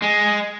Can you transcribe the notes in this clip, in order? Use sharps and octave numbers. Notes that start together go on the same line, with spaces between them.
G#3